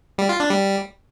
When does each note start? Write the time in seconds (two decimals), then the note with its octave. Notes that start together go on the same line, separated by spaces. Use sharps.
0.18 G3
0.29 F4
0.40 D4
0.51 G3